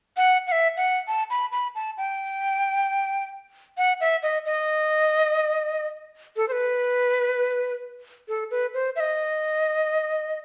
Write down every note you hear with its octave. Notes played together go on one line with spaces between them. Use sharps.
F#5
F#5
E5
F#5
A5
B5
B5
A5
G5
F#5
E5
D#5
D#5
A4
C5
B4
A4
B4
C5
E5
D#5